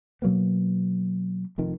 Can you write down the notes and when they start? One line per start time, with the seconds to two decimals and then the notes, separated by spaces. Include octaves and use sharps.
0.22 B2 F#3 A#3 B3
1.58 F1 F2 D#3